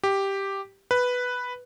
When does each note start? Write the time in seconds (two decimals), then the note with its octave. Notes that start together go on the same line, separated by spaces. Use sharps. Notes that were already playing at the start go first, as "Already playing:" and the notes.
0.04 G4
0.91 B4